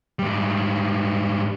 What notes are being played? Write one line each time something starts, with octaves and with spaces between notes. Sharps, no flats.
G#2 G3